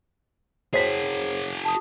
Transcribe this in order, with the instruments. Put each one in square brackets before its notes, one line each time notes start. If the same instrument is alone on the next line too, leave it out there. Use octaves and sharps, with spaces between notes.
[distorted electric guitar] F#4 G#4 [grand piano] C5 B6 [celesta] C#5
[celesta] A5 D#6